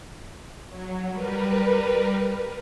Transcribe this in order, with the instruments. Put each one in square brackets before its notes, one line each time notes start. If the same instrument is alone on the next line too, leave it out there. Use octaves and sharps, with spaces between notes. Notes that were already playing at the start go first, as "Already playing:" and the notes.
[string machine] F#3
G3 A#4 B4